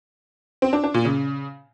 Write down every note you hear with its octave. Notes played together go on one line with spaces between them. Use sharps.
C4
D4
D4
A#2
C#3